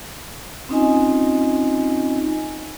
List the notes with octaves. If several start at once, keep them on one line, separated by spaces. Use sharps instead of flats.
C4 C#4 D#4 F4 D#5 G#5